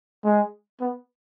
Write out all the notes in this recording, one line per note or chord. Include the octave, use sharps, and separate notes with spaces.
G#3
B3